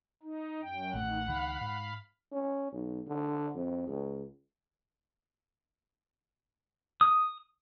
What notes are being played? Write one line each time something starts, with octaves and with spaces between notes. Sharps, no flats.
D#4
F#2 G5
A1 D#3 A3 F#5
C#2 D#3 F5 B5
G#2
C#4
B1
D3
F2
C#2
D#6